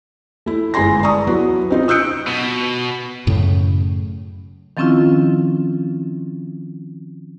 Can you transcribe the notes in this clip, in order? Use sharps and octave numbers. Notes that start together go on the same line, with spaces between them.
A3 E4
G1 G#3 E4 G#5 C6 A#6
D5 A5 A#5 C#6 D#6
F#3 B3 E4 F#4
C4 D#4 F4
D#6 E6 F#6 G6 C#7 D7
B2
F#2 A2 C#3
D#3 F3 C4 C#4 E4 F4